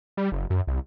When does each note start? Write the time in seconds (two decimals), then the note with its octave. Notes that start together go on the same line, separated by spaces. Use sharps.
0.17 G3
0.32 F#1
0.50 F#2
0.67 C2